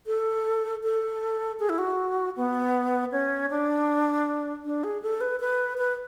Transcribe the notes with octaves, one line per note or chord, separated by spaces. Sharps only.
A4
A4
G#4
E4
F#4
B3
C#4
D4
D4
G#4
A4
B4
B4
B4